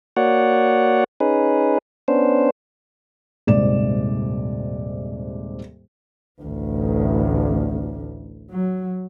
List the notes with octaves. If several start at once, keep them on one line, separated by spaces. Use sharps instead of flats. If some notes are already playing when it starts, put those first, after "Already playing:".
A#3 F#4 C#5 D5 F#5
C#4 D#4 G#4 B4
B3 C#4 D4 C5
D#1 G#2 C3 D5 E7
A1 D2
F#3